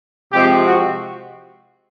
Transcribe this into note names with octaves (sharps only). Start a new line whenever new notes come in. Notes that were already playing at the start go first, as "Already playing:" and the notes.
C3 F3 G#3 C4 G4
F#4